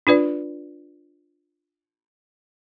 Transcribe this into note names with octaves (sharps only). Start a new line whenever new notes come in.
D4 F4 B4 D5